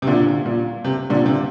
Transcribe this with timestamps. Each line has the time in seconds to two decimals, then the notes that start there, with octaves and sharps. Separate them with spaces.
0.02 C3
0.07 A#2 D3
0.46 A#2
0.84 C3
1.10 A#2 D3
1.26 C3